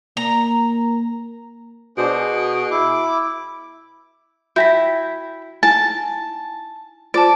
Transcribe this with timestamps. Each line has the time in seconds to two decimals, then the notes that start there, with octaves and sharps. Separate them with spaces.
0.17 A#3 A#5
1.98 B2 D4 G#4 C5
2.18 G#4
2.71 E4 D6
4.56 E4 F#4 C#5 G5 G6 A#6 B6
5.63 D#4 E4 G#5 A5
7.14 F4 C5 D5 A5 D6 D7